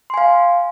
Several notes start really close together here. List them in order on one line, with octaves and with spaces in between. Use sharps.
C6 G#5 F5